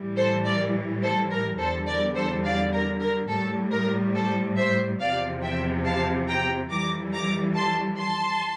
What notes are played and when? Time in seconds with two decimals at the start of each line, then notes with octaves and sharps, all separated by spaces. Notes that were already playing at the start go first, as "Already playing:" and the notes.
Already playing: A2 E3 G3
0.16 A4 C5
0.45 A#4 D5
1.01 A4 C5
1.30 A#4
1.58 E2 D3 G3 A4 C5
1.86 A#4 D5
2.15 A4 C5
2.44 D5 F5
2.72 A#4
3.00 A#4
3.28 A2 G3 A4
3.71 A#4
4.14 A4 C5
4.56 C5 E5
5.00 E2 C3 F3 D5 F5
5.42 E5 G5
5.84 F5 A5
6.27 G5 A#5
6.69 F2 E3 G3 A#5 D6
7.12 A#5 D6
7.55 A5 C6
7.98 A5 C6